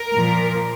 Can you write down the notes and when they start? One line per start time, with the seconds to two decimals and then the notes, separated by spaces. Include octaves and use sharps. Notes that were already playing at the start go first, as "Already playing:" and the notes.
Already playing: A#4
0.17 A#2 F3